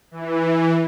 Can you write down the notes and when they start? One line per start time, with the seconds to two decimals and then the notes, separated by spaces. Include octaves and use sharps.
0.11 E3